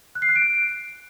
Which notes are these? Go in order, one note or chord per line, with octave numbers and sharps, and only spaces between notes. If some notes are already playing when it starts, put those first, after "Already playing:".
F#6
C7
F#6
D7